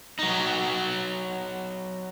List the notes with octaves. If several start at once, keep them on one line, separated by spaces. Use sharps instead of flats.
F#3 D#4